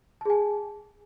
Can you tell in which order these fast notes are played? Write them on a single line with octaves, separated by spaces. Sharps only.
A5 G#4 G#5